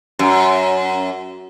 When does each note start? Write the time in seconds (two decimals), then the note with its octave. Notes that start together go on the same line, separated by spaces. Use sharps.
0.19 F#2